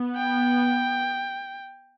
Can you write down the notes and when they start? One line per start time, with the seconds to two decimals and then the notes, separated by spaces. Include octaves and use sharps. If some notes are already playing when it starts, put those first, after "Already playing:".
Already playing: B3
0.16 G5